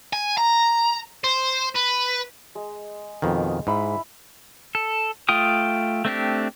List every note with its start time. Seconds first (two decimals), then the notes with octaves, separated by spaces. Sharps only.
0.13 G#5
0.38 A#5
1.24 C5
1.76 B4
2.55 G#3
3.22 F2 B2 D#3
3.67 G#2 E4 B5
4.75 A4
5.29 A3 F4 G5 D#6
6.05 A3 C4 D4 G4